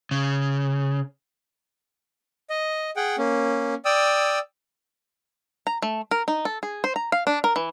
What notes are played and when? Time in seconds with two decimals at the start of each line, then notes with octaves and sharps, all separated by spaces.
0.11 C#3
2.50 D#5
2.96 G#4 F#5 G5
3.18 A#3 C#4
3.85 D5 G5 D#6 E6
5.67 A#5
5.82 A3
6.11 A#4
6.28 D#4
6.45 A4
6.63 G#4
6.84 C5
6.96 A#5
7.12 F5
7.27 D4
7.44 A#4
7.56 E3